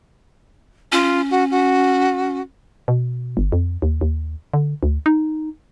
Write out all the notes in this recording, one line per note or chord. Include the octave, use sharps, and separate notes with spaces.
C#4 F4
F#4
F#4
B2
G1
F2
D#2
D#2
D3
D2
D#4